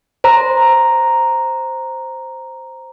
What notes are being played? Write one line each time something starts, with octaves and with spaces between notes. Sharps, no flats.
C5 A#5